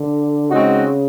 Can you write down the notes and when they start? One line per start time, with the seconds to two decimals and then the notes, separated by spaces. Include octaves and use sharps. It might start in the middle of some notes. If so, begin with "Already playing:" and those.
Already playing: D3
0.50 C#3 G#3 C4 D#4 F#4